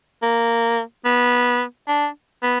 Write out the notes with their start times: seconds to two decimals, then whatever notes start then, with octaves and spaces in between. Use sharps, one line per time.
0.22 A#3
1.05 B3
1.88 D4
2.43 B3